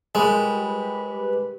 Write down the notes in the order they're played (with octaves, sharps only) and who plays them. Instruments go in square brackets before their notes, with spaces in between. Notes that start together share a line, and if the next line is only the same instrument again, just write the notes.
[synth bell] G3 G#4 A#4 [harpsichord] G#3 [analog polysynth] G4 B4 B5